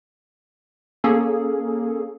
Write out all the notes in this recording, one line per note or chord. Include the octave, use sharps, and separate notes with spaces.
A#3 C#4 G#4 A4